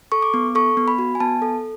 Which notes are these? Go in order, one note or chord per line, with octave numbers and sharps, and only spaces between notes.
A4 C#6
D6
B3
A4 C#6
B3
B5
F#4
G#5
B3 A5
A4